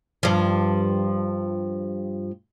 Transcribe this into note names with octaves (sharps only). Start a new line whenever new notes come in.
G2 F3